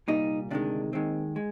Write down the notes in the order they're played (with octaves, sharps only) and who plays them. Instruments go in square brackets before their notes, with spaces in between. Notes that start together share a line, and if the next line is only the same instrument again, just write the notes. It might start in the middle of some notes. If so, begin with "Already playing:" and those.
[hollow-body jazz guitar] C2 A#2 G3 D#4
D2 C3 D#3 G#3 D4
D#2 D#3 G#3 C4
G#3